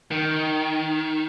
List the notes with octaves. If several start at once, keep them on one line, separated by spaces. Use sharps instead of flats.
D#3